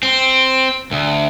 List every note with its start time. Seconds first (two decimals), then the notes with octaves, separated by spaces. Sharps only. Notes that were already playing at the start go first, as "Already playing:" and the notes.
0.03 C4
0.91 D2